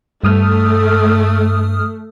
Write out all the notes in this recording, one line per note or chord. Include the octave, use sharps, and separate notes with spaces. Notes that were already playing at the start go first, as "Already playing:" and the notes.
G2 A3 D#6 F6